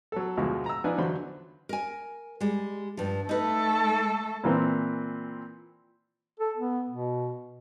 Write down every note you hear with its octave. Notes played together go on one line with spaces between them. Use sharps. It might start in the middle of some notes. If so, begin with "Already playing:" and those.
F#3 A4
D2 B2 F3 G#3 F#4
A#5 E6
F3 D4 D#4 B4 G#5
E2 D3 F#3 C5 B5
A#4 G#5
G3 G#3
G2 F3
A3 D#4 A4 B4
A#2 E3 C4
A4
B3
B2